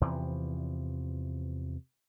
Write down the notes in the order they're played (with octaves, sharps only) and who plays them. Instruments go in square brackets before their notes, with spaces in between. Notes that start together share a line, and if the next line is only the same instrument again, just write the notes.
[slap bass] E2 C3 E3 F3